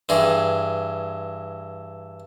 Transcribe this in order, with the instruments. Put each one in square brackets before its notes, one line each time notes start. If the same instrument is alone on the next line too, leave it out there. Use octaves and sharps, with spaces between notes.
[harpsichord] G2 E3 G#4